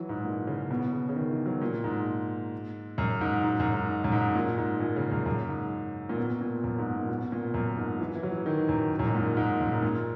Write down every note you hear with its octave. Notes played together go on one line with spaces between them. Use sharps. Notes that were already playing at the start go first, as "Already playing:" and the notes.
Already playing: E3 F#3
G#2
A#2
C#3
B2
C#3
C#3
D#3
E3
F#3
A#2
G#2
F#2
G#2
G#2
F#2
G#2
F#2
G#2
A#2
G#2
A#2
C#3
F#2
F#2
G#2
A#2
B2
A#2
F#2
G#2
A#2
B2
A#2
F#2
G#2
E3
E3
F#3
E3
D#3
F#2
F#2
G#2
A#2
G#2
F#2
G#2
A#2